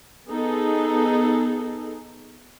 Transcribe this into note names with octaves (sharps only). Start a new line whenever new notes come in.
B3 D#4 G#4 A4